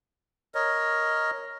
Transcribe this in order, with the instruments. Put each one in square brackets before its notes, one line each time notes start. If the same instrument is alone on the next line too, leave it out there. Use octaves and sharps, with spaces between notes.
[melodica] A#4 C#5 D#5